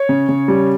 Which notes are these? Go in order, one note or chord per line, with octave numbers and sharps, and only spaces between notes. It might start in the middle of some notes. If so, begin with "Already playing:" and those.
Already playing: C#5
C#3
C#3
G3